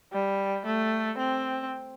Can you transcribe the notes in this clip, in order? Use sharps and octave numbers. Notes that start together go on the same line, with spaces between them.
G3
A3
C4